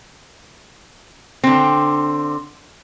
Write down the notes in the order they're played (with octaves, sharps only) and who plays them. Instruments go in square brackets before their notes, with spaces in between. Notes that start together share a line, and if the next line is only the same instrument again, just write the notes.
[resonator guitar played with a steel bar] D3 C4